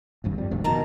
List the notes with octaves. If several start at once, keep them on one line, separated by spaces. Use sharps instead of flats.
D1 G#1 G2
F2 G3
F1 D2 G2
B2 D#3 A5 A#5